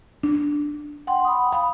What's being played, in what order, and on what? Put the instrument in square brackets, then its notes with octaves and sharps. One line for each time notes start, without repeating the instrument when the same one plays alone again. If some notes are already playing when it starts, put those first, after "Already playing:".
[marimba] D4
[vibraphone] F#5 G5 C6
B5 D#6
[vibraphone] F5 [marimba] B5